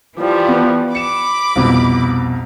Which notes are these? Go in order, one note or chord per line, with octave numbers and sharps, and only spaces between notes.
E3 F3 G3
B3
B5 D6 C#7 E7
C2 F2 B2